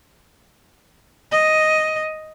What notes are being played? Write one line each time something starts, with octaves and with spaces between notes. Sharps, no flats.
D#5